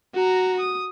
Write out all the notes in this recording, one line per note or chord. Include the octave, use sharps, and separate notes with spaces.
F#4 A#5
D#6